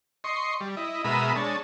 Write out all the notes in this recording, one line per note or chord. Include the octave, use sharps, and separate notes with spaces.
D#5 C6 C#6
G3
E4 D#5
B2 G#3 A#4 E5 B5 D#6
G#3 D4 C#5 A5